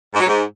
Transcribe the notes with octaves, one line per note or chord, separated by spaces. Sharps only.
G#2
F#3
G#2